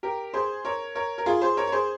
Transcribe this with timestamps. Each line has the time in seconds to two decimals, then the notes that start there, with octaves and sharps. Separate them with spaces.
0.03 G4 A#4
0.34 G#4 C5
0.65 A#4 C#5
0.95 A#4 C#5
1.18 A#4
1.26 F4 G#4
1.41 G#4 C5
1.57 A#4 C#5
1.67 C#5
1.72 G#4 C5